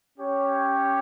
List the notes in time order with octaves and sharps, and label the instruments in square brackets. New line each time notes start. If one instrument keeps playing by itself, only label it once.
[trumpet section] C#4 G4 C#5